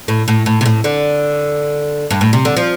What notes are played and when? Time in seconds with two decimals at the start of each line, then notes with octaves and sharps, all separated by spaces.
0.08 A2
0.28 A2
0.46 A2
0.61 C3
0.66 A2
0.84 D3
2.11 G2
2.21 A2
2.33 C3
2.45 D3
2.57 F3